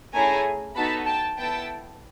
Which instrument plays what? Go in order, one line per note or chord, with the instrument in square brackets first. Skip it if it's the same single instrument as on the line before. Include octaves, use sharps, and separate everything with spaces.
[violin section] A3 C#4 E4 G#4 G#5 A#5
B3 D#4 F#4 A4 A5 B5
G5 A5
B3 E4 A4 G5 A5